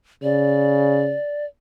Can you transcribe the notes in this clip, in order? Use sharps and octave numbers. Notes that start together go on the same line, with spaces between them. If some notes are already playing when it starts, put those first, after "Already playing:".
C#3 D5